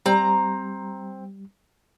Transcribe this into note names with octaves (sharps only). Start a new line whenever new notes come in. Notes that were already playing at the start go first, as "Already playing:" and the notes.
G3 C4 A#5